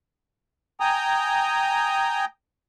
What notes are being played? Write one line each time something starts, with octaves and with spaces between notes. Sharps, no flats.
G5 G#5 A#5 D#6